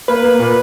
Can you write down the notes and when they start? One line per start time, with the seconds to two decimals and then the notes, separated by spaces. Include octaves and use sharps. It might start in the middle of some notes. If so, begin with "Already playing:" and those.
0.08 A#3 B4
0.24 A#3
0.40 A#2